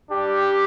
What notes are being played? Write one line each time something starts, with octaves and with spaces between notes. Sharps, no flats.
G3 D4 G4